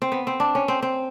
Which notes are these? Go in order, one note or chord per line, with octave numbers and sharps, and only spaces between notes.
C4
B3
C4
D4
C#4
C4
C4